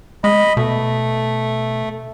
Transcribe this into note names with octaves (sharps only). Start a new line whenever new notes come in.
G#3 D#5 B5
B2 A3